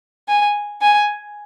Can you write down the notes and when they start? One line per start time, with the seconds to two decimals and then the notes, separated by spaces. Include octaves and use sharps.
0.28 G#5
0.82 G#5